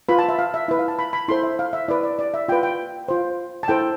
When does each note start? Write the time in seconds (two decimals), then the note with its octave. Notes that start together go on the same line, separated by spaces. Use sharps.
0.09 F4 B4 B5
0.18 A5
0.29 E5
0.39 F5
0.54 E5
0.68 E4 B4 E5
0.79 F5
0.88 A5
0.99 B5
1.13 B5
1.28 E4 A4 C5 C6
1.43 E5
1.59 F5
1.73 E5
1.88 E4 B4 D5
2.03 D5
2.19 D5
2.34 E5
2.48 F4 B4 G5
2.63 G5
3.08 F4 C5
3.63 A5
3.68 E4 A4 C5 G5